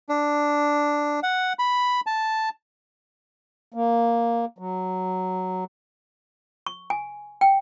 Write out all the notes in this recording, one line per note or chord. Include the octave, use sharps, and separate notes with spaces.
D4
F#5
B5
A5
A#3
F#3
C#6
G#5
G5